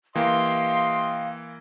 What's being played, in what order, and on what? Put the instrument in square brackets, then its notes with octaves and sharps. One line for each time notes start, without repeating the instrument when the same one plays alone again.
[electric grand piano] E3 A#3 [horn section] G4 D#5 C6 [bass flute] F5